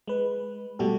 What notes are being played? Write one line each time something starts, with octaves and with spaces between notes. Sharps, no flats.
G#3 B4
B2 G3 A3 F#4 G4 A4